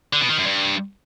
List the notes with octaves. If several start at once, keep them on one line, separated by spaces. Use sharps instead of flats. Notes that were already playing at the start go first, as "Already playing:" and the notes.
D3
B2
D#3
F#2
G2